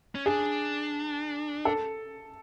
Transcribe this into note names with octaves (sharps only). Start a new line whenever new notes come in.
C#4
D4 G#4
A4